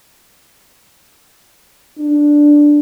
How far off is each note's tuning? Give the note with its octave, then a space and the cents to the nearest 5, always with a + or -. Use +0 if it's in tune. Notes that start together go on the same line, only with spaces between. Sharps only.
D4 +0